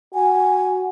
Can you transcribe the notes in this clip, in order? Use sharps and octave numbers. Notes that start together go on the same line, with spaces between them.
F#4 G#5